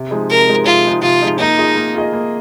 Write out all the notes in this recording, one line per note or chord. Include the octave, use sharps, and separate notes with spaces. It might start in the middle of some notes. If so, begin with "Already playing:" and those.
Already playing: C3
F3 G#3 D#4 G#4
C3 A#4
F3 G#3 D#4 G#4
C3 F4
F3 G#3 D#4 G#4
C3 F4
F3 G#3 D#4 G#4
A#3 D#4
F4 G#4 D#5
A#3
F4 G#4 D#5
A#3